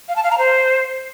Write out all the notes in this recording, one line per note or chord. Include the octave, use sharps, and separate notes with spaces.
F5
A5
F5
A#5
C5